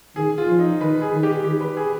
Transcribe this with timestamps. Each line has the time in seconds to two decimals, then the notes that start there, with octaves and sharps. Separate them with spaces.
0.16 D#3 G#4
0.38 F4
0.48 F3
0.59 D#4
0.81 D#3 B4
1.02 G#4
1.13 D#3
1.23 G4
1.44 D#3 G4
1.60 B4
1.77 G#4